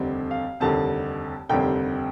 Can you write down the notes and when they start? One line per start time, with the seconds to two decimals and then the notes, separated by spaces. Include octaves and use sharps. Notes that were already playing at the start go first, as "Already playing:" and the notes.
Already playing: F1 D#2 D3 G3 C4
0.31 F5
0.60 F1 D#2 D3 G3 C4 A5
1.49 F1 D#2 D3 G3 C4 G5